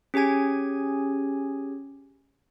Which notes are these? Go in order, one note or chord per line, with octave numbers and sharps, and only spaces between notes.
C#4 G4 G#4 G#5 G#6